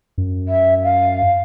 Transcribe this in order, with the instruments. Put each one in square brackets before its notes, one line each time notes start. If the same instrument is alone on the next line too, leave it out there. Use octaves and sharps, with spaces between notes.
[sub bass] F#2
[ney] E5
F5